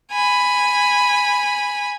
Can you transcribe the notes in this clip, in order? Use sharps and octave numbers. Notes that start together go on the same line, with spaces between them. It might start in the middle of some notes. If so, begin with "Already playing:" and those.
G#5 B5